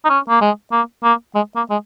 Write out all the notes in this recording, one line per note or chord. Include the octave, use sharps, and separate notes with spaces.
D#4
C#4
A#3
G#3
A#3
A#3
G#3
A#3
G#3